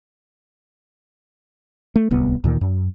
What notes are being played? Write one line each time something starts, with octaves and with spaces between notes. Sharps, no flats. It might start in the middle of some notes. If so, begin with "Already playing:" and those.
A3
D1 C2 B3
D2 A#2 D#3
F#2